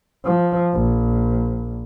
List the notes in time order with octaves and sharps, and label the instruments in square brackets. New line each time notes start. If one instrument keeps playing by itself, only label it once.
[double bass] F3
A#1